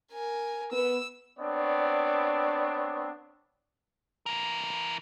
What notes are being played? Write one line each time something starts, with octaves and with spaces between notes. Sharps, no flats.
A#4 G#5
B3 E6
B3 C4 D4 C#5 D5
E3 A#4